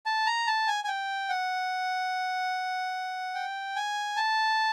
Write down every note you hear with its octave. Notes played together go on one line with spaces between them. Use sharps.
A5
A#5
A5
G#5
G#5
G5
F#5
G5
G#5
A5